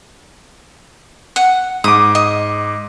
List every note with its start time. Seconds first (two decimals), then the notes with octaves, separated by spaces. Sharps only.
1.36 F#5
1.84 G#2 D6 D#6
2.15 D#5